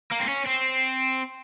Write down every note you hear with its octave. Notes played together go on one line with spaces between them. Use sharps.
A#3
C4
C#4
C4